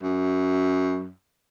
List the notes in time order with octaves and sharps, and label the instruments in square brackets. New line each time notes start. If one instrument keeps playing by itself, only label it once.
[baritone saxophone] F#2